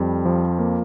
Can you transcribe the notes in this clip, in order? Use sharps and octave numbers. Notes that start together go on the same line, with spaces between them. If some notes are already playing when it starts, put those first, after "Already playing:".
Already playing: F2 G3
F3
A#3